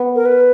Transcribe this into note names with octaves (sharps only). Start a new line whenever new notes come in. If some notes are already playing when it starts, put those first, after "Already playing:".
Already playing: B3
A#4
B4